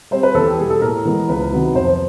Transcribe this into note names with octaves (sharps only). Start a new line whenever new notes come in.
G3 C4 C5
B4
E2 A4
G4
B2 G3 G#4
A4
A2 A#4
E3 G#3 B3
C#2 B4
C3 D#3 F#3 B3
F2 C5